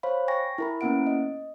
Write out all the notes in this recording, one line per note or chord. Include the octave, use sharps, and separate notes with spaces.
C5 C#5 F5 B5
G5 G#5 C#6 A#6
E4 A#4 B5
A#3 B3 C#4 E4 F#5 D7
D#5